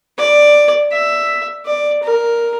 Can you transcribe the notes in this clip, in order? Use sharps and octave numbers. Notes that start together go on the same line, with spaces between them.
D5
E5
D5
A#4